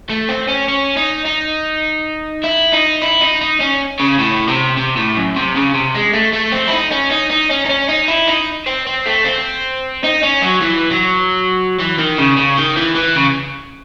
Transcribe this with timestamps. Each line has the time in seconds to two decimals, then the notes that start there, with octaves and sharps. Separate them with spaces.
0.10 A3
0.29 C4
0.48 C#4
0.68 C#4
0.97 D#4
1.26 D#4
2.44 E4
2.73 D#4
3.02 E4
3.21 D#4
3.41 D#4
3.60 C#4
3.99 C#3
4.19 A2
4.48 C3
4.77 C3
4.96 A2
5.16 F#2
5.36 C3
5.56 C#3
5.74 C3
5.95 G#3
6.14 A3
6.33 A3
6.52 C4
6.68 E4
6.72 D#4
6.92 C#4
7.11 D#4
7.30 D#4
7.50 C#4
7.65 D#4
7.69 C#4
7.89 D#4
8.08 E4
8.28 D#4
8.66 C4
8.87 C4
9.06 A3
9.25 C4
10.04 D#4
10.23 C#4
10.42 F#3
10.61 E3
10.91 F#3
11.79 E3
11.98 D#3
12.18 C#3
12.37 C#3
12.57 D#3
12.77 E3
12.95 E3
13.15 C#3